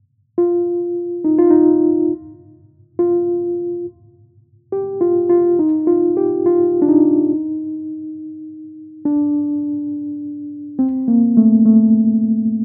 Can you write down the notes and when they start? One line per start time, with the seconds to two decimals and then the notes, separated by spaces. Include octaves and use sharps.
0.38 F4
1.25 D#4
1.38 F4
1.51 D#4
2.99 F4
4.72 G4
5.01 F4
5.30 F4
5.59 D#4
5.87 F4
6.17 G4
6.46 F4
6.82 D4
6.88 D#4
9.05 D4
10.79 C4
11.08 A#3
11.37 A3
11.65 A3